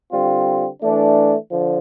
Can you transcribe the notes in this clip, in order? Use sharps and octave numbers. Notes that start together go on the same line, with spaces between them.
D3 G3 C4 F4
E3 A3 D4
D3 F3